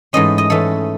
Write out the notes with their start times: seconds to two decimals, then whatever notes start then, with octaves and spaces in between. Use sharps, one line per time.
0.13 G#2 E3 A3 C#4 D#5
0.38 D#5
0.50 G#2 E3 A3 C#4 A4